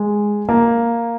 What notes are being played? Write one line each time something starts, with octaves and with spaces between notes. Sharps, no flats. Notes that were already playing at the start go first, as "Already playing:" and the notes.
Already playing: G#3
A#3